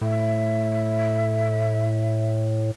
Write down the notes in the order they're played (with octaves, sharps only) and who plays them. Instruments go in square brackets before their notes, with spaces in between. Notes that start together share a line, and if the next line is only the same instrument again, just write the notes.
[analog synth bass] A2 [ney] E5